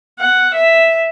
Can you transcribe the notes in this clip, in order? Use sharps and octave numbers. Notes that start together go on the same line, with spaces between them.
F#5
E5